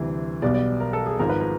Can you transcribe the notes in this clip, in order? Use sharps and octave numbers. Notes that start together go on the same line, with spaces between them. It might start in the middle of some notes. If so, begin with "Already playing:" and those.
Already playing: D2 C3 E3 G3
B1 B2 G3 D5
D5
A#4
A4
G#4
G#1 G#2 F3 A#4
B4
A#4